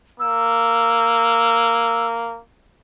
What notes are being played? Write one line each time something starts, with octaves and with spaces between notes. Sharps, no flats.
A#3 E6